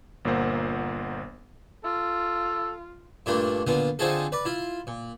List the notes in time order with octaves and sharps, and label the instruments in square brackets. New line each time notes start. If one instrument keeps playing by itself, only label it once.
[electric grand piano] G1 A#2 A#3 C5 F#5
[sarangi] F4 [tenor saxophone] A4
[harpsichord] G2 A#2 A3 A#3 D4 F4
A#2 D3 B3 F4
D3 C4 D#4 F4 G#4 A4
B4 D5
E4 F4
A#2